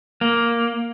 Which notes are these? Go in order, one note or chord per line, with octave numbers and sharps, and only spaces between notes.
A#3